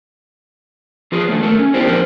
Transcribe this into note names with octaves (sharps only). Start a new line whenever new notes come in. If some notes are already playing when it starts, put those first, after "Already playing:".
F3 F4 G#4 B4
D3 D#3 A3 A#3
A3 A4 A#4
C#4
B3 D4 E4 G4 A#4 C5
D3 F3 A#4 C5